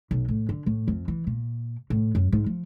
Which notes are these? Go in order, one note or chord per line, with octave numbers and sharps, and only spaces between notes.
B1
A2
D3
A2
F2
E3
A#2
A2
F#2
G#2
F3